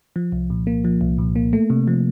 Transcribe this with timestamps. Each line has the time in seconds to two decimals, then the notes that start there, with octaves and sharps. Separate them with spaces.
0.16 F3
0.32 C2
0.50 A#2
0.67 A#3
0.85 F3
1.01 C2
1.18 A#2
1.36 A#3
1.53 A3
1.70 C3
1.87 F3